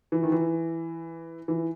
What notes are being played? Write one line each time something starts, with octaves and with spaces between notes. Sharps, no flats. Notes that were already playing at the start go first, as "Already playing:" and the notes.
E3
D#3
E3
E3